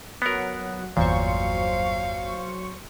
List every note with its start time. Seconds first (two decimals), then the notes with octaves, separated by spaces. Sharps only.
0.22 F#3 B3 A#4 F#5
0.97 G1 E2 A#2 E3 F#3 C5 F5 C#6